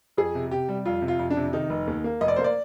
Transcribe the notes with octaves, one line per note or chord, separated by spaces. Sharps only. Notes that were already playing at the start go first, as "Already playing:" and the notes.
F2 G#4
C3
C3 G4
G3
F2 F4
C3
F4
F2
D4
C3
D#3 D#4
F1
D#2
A#3
F1 D#5
D5
A#3 C5
D5